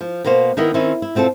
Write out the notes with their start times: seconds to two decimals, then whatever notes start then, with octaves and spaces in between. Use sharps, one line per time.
0.01 F3
0.24 B2 A#3 B3 C5 F5
0.57 D#3 B3 E4 A#4 B4 D#5
0.74 D#3 C4 C#4 D#4 E4
1.02 E4
1.15 B2 C4 F4 A4 A5